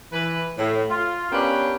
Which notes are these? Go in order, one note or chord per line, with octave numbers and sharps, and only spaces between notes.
E3 B4
A2
F4
A#3 B3 C#4 D4 G4 B4